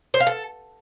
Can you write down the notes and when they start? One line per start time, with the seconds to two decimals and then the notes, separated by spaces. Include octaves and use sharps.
0.14 C5
0.20 F5
0.27 A4